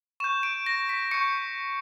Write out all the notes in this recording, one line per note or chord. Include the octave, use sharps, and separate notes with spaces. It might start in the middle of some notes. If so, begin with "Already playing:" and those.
C#6 G6 E7
D7
A#6
B6
C#6 G6 C#7